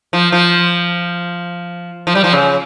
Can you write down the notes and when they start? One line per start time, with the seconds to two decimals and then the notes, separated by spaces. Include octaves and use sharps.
0.13 F3
0.32 F3
2.07 F3
2.15 G3
2.24 F3
2.33 C#3